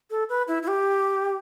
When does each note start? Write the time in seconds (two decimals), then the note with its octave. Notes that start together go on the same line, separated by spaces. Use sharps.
0.10 A4
0.29 B4
0.48 E4
0.63 E4
0.68 G4